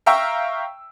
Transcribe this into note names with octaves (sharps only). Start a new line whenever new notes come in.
E5 F5 G5 A#5 C#6 E6